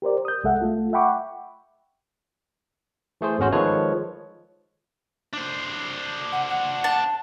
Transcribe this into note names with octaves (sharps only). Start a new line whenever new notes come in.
G4 A#4 C5 D5
D#6 G6
C2 G#3 A4 E5 F#5
A3 F4 A4
E5 F#5 G5 B5 C#6 D6
E3 A3 G#4 C5
G#1 E2 C#4 F#4 C5
D#3 F3 G#3 A4 B4 C#5
D4 C5
F#5
F#5
A5